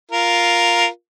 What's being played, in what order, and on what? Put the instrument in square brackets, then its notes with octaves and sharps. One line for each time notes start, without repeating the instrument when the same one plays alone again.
[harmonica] F4 A#4